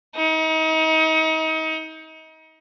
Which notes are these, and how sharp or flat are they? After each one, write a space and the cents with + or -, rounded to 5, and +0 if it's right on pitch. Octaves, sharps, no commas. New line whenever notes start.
D#4 +35